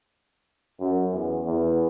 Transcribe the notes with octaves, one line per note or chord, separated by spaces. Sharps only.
F#2
E2
E2